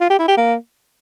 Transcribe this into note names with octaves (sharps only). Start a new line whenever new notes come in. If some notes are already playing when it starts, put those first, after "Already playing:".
F4
G4
E4
G4
A#3